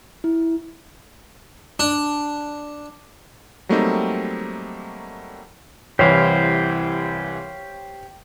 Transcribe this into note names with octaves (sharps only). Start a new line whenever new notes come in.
E4
D4
F#3 G3 A3 A#3 C4 D#4
C2 E3 E4 G4 C5 C#5 F5